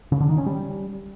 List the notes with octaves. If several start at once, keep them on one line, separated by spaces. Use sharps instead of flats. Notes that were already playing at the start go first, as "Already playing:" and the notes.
C#3
D3
D#3
C#4
G3